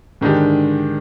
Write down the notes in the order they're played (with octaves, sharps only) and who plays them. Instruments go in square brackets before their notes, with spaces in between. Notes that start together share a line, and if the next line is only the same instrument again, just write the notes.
[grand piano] G#2 D#3 G#3 D4 G4 [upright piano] D3